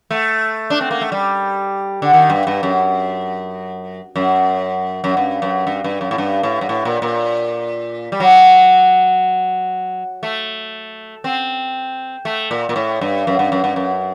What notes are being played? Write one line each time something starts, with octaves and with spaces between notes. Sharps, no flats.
A3
D4
C4
A#3
A3
G3
D3
D#3
G2
G2
F#2
F#2
F#2
G2
F#2
G2
G2
F#2
A2
G2
A2
G2
A2
A#2
A#2
G3
F#3
A3
C4
A3
A#2
A#2
A2
G2
F#2
G2
F#2
G2
F#2